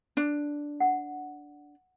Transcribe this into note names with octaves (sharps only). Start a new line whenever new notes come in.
D4
F#5